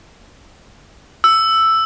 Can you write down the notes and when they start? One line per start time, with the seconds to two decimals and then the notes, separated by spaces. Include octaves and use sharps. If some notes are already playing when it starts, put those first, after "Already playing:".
1.24 E6